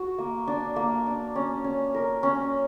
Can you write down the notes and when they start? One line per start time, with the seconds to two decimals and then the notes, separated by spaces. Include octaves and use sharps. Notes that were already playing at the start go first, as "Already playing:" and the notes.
Already playing: F#4
0.18 A#3
0.47 D4
0.76 A#3
1.06 D4
1.36 C#4
1.64 C#4
1.94 A#4
2.23 C#4